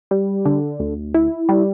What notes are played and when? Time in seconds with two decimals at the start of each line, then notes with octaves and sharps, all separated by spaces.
0.11 G3
0.45 D3
0.80 D2
1.14 E4
1.49 G3